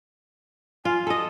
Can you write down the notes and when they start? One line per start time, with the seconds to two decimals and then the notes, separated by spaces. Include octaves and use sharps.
0.85 F4 G#5
1.07 A4 D#5